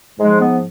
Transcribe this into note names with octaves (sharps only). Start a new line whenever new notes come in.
G#2 F3 G#3
B3